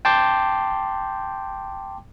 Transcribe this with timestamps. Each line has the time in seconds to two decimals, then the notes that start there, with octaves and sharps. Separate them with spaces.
0.05 G5 A5 C6 D6 G6